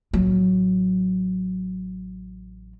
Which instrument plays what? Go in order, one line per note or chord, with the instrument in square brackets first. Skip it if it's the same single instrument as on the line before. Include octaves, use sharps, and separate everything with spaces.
[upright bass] A1 F#3